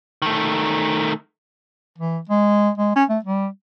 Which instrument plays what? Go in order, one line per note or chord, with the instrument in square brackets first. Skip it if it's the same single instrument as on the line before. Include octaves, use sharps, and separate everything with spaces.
[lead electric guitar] D#3 A3
[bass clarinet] E3
G#3
G#3
C#4
A3
G3